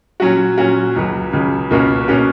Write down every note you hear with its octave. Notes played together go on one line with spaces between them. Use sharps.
A#2 F#3 C#4 F#4
A#2 F#3 C#4 F#4
C#2 C#3 F#3
C#2 C#3 F#3
C#2 B2 A#3 C#4 F#4
B2 A#3 C#4 F#4